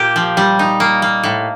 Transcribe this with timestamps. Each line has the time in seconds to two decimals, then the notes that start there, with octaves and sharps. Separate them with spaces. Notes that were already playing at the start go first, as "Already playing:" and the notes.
Already playing: A#2 A#3 G4
0.16 F3
0.37 G3
0.59 D#4
0.80 A#3
1.02 A#3
1.23 A2